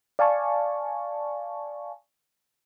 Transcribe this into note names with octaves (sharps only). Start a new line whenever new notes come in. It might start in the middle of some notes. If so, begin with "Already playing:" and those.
D5 F5 G#5 A5 C#6